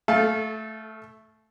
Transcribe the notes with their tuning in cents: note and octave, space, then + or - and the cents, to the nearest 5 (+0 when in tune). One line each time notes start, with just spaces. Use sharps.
A3 +0 A4 -30 F5 +0